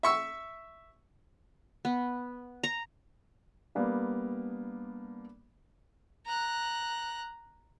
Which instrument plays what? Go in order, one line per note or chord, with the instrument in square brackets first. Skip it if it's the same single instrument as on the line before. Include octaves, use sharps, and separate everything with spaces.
[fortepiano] E5 C#6 E6
[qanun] B3
A#5
[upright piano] G3 A#3 B3 D4
[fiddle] A#5 F#6